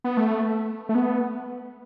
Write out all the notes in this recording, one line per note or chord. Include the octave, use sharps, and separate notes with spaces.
B3
A3
A3
B3